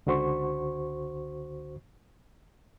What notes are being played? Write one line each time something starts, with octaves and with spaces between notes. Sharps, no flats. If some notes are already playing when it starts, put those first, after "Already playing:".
C#2 D3 F#4 C5 C#6